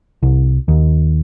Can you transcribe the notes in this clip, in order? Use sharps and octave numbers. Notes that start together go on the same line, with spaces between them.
C2
D#2